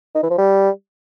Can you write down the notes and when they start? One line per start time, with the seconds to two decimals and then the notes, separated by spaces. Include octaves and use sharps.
0.15 D#4
0.23 E3
0.31 F3
0.38 G3